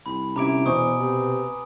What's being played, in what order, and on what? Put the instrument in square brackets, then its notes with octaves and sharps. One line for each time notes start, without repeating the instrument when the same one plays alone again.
[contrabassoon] C2 [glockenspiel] B5
[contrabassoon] G1 [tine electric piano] C3 E4 [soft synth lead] C#4 [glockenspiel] A#5 D6 D7
[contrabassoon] E2 [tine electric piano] B2 [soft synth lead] C5 [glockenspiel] G#5 C#6 D#6
[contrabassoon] C3 [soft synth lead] B4